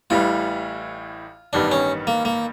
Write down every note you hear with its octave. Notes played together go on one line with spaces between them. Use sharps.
A1 A2 E3 G3 F4
A1 G2 D#3 G3 B3 D4
C#4
A#3
A#3